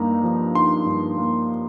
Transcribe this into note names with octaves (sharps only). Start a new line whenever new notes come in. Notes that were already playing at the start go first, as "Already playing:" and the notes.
Already playing: G2 A#3 D#4 A#5
F3
D#4 C6
G2
A#3